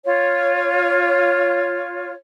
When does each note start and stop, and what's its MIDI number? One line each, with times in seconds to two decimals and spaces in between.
0.04 2.12 65
0.04 2.12 73